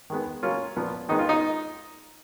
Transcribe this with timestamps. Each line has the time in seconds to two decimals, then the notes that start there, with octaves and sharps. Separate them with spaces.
0.10 D#3 G#3 B3
0.43 C#3 F#3 A#3 C#4 F4
0.76 A#2 F3 B3
1.09 D#3 G#3 B3 D#4
1.19 F4
1.29 D#4